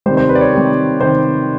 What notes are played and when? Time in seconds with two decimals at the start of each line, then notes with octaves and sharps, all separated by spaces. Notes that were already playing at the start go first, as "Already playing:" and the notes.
0.06 C3 D#3 G3 C5
0.17 C5
0.29 B4
0.35 D5
0.41 C#5
0.53 C3 D#3 G3
1.00 C3 D#3 C5